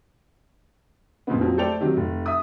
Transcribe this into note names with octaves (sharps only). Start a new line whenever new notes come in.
F2 A#2 C#3 B3
F2 F3 F#3
A3 A4 C5 D5 G5 F7
C3 D#3 F#3
F1
E5 D#6